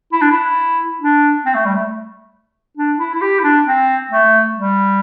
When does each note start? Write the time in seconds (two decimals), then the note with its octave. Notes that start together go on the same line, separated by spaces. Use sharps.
0.13 E4
0.21 D4
0.31 E4
1.01 D4
1.45 C4
1.54 A3
1.65 G3
1.75 A3
2.77 D4
2.99 E4
3.14 E4
3.21 G4
3.39 E4
3.44 D4
3.66 C4
4.10 A3
4.54 G3